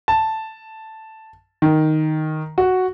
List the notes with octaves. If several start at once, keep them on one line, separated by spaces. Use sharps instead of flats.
A5
D#3
F#4